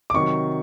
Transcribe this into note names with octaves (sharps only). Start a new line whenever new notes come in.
D6
C3 D#3 F#3 C#6